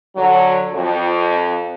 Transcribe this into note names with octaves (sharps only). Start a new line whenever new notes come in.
D3 F#3
F2